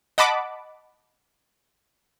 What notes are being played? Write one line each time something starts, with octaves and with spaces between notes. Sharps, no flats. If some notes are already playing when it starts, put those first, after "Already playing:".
D#5 F#5 A5 B5 D6